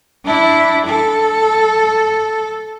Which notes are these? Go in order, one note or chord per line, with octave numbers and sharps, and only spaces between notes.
D4 E4
A4